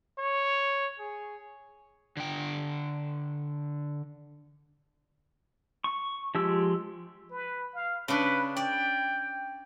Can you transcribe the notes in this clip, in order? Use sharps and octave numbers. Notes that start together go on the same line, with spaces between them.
C#5
G#4
D3 G5
C#6
F3 G#3 G4 E6
B4
F5
C#3 D4 B4
D5 G5